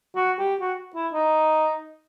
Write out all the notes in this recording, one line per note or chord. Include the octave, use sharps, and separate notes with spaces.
F#4
G4
F#4
E4
D#4